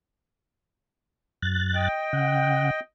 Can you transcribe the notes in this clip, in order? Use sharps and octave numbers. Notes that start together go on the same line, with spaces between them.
F#2 F#6 A6
D#5 G5
C#3 F#5